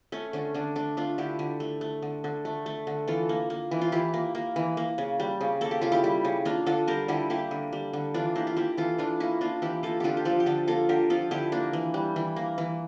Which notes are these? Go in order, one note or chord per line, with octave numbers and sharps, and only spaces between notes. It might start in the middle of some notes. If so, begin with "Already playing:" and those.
A3 C#4
D3 C#4
D3 D4
A3 D4
A3 D4 F4
D3 E4 G4
D3
A3
A3
D3
D3
A3
A3
D3
E3 F4 A4
A#3
A#3
E3
F4
E3 E4 G4
A#3
A#3
E3
A#3
C#3
G3
C#3
A#3 A4
G4
C#3 F4
E4 G4
G3
C#3
A#3 D4 F4
D3 F4 A4
G3 G4 A#4
D3 E4 G4
A#3 E4 G4
D3
G3
D3
E3 D4 F4
A#3 E4 G4
F4
A#3 E4 G4
E3 F4 A4
E3 D4 F4
A#3 C#4 E4
A#3 D4 F4
E3 E4 G4
A#3 F4 A4
D3 D4 F4 G4
G4
F3 F4 A4
G4
D3 F4 A4
A#3 F4 A4
D3 G4 A#4
F3 F4 A4
D3 E4 G4
A#3 D4
E3
G3
E3
A#3
E3